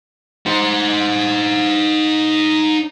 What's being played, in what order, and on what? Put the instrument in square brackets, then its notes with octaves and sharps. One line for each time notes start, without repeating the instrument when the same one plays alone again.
[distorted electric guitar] D#4 C5